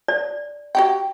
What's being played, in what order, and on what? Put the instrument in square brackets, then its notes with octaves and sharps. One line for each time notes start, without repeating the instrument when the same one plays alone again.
[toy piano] D5
[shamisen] F#4 G4 G5